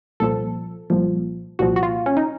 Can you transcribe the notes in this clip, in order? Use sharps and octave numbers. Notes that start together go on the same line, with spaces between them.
C2 A#2 F3 A4
C2 A#2 F3
C2 A#2 F3 F#4
F#4
F4
C#4
D#4